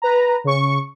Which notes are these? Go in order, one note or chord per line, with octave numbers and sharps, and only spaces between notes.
B4 A#5
C#3 C#6